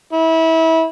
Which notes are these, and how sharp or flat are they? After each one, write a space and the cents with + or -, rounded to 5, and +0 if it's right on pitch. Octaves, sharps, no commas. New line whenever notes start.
E4 -25